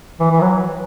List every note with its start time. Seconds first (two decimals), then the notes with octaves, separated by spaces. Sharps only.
0.20 E3
0.31 E3
0.41 F#3